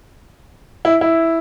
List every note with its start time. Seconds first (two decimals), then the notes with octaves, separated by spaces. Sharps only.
0.85 E4
1.01 E4